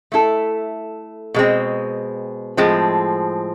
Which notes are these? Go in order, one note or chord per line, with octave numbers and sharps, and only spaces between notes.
A3 E4 A4
B2 G#3 C4
A2 F3 G#3 C4